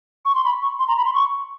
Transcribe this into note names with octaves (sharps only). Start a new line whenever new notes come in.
C#6
C6
B5
C#6
C6
A#5
B5
C6
C#6